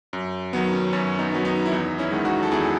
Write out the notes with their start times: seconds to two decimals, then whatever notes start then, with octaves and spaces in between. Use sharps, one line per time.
0.13 F#2
0.53 D#3 F#3 B3
0.73 C#4
0.93 F#2 C#4
1.19 B3 D#4
1.32 D#3 F#3 B3
1.45 B3 D#4
1.66 E4
1.72 E2 B3 D#4
1.98 C#4 E4
2.12 D#3 G#3 B3
2.25 D#4 F#4
2.43 A4
2.51 E2 E4 G#4